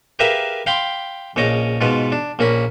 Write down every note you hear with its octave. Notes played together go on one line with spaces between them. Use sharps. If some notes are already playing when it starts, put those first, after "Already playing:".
G4 G#4 A#4 B4 E5 F5
F5 G5 B5 C6 D6
A#1 C#3 C#5 D#5 D6
G#2 B2 B3 F4 B4
D4
A#1 A#3 C#4 B5